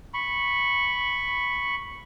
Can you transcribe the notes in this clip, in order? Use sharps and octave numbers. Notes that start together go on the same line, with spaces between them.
B5 C#6